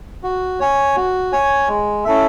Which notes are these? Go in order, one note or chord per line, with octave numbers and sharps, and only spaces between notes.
F#4
C#5 G#5
F#4
C#5 G#5
G#3
C#4 E4 A4 E5